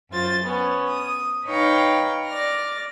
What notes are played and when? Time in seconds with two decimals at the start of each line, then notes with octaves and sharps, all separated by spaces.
0.10 F#2 F4 C5 A6
0.43 B3 C#4
0.88 D#6
1.46 D#4 B4 C#5 F5 G5 A#5
2.25 D5 F6 A#6